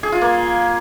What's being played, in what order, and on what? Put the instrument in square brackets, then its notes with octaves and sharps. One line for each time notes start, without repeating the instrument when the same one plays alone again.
[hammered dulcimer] G#4
F4
A#3